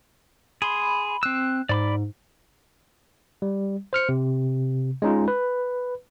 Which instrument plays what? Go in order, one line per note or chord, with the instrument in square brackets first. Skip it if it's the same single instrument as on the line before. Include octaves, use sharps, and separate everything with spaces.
[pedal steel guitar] G#4 C6 [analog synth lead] B5
[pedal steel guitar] C4 E6 [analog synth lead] F#6
[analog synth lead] G#2 [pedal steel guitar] D5 B5 D6
[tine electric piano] G3
C5 F6 C#7
C3
G#3 C#4 D#4 F4
B4